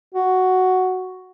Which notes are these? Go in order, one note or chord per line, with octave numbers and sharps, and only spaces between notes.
F#4